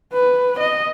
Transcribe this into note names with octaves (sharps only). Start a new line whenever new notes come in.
B4
D#5